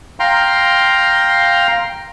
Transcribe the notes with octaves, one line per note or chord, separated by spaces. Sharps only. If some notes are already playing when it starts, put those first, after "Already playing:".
F5 G5 A#5 C6